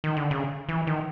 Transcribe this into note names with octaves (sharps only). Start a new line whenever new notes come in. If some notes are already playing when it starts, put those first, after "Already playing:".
D#3
D3
C#3
E3
D#3